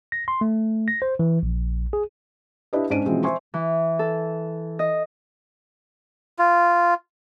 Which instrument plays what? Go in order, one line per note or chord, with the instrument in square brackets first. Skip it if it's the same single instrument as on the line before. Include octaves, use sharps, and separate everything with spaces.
[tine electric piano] A#6
C6
A3
A#6
C5
E3
A#1
G#4
[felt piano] D4 E4 G4 B4 D#5
G#2 C#4 D4 D7 D#7
B2 E3 F3 G#3 C4 C#4
C5 E5 G#5 C6 C#6
[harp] E3
A4
D#5
[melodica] F4